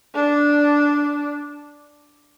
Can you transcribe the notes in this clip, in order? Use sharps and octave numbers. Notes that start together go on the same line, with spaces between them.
D4